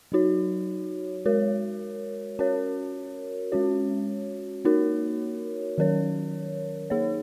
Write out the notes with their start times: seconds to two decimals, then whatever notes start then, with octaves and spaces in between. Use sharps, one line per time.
0.12 F#3 D#4 F#4 C#5
1.25 G#3 F#4 A#4 C#5
2.39 C#4 F#4 A#4 C#5
3.52 G#3 C#4 F#4 C#5
4.65 A#3 D#4 F#4 A#4 C#5
5.78 D#3 F#3 C#4 A#4 C#5
6.90 A#3 D#4 G#4 C#5